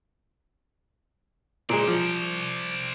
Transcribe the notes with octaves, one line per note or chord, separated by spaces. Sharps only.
A#2 G#3 C5 D5
F3